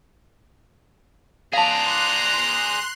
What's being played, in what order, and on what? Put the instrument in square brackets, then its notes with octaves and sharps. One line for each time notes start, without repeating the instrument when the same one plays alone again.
[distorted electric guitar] G#4 D5 [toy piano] F5 A5 [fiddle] A#5 [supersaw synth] C6 F#6